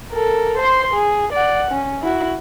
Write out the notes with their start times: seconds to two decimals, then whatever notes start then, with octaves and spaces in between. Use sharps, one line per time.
0.12 A4 A#4
0.58 C5 C6
0.94 G#4
1.33 D5 F#5
1.71 C#4
2.03 E4 F#4